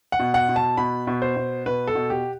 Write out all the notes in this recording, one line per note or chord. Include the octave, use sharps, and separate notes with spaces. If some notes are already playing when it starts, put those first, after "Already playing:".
F#5
B2
F#5
B2
A5
B2 B5
B2
C5
B2
B2 B4
A4
B2
G4